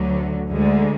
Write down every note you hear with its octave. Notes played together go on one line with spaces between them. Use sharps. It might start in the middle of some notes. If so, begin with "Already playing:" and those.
Already playing: D2 D3 F#3
D2 D3 G#3